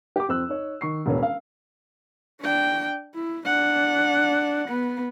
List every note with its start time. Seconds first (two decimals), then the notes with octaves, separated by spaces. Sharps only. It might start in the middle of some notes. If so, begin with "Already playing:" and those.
0.16 G4 G5 D6
0.28 F2 C4 E6 F#6
0.49 D#4 C#5
0.81 D#3 C#6 C7
1.06 E1 A1 B3 C#4
1.23 F5
2.41 D4 G5
3.15 E4
3.45 D4 F#5
4.69 B3